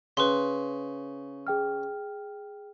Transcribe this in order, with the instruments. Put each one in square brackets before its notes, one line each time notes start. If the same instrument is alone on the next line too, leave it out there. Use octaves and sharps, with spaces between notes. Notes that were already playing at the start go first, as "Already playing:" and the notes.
[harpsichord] C#3 [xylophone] B4 C6
[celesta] G#4 G5 F6